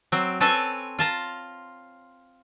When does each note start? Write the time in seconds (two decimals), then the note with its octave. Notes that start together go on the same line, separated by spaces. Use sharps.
0.12 F#3 C4
0.40 C4 A4 B4 C#5 G#5 A5
0.99 F4 A5 A#5